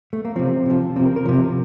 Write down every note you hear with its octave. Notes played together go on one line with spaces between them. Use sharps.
A3
A#3
C3 F3 C4
C3 F3
C3 F3 C4
A#4
A#4
C3 F3